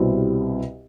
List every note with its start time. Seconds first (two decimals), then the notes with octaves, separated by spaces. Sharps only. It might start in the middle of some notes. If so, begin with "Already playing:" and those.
Already playing: C2 B2 G3 C4 E4